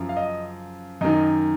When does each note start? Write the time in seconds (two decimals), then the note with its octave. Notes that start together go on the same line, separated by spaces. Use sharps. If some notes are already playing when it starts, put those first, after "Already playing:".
Already playing: F#2 C#3 F3
0.09 F5
0.17 D#5
1.01 F#2 D#3 D#5